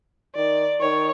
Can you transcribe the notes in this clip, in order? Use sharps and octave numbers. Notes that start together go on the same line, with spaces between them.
D#3 D5
D#3 C#5